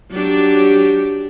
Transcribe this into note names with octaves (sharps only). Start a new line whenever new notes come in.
F#3 D4 G4